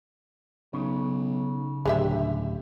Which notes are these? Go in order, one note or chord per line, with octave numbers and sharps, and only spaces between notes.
B1 C#3
D1 G2 G#3 G4 E5